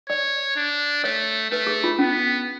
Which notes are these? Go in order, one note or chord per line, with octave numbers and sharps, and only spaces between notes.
C#5 D5
D4
A3 C#5
A3 B4
G#4
F4
B3 C#4